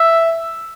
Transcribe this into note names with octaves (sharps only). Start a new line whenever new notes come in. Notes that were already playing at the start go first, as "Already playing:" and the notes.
Already playing: E5